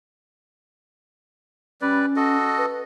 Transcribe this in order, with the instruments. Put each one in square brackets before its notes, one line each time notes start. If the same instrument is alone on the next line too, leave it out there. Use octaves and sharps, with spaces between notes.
[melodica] G3 B4 D5 [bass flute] C#4
[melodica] F#4 A4 D#5
[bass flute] B4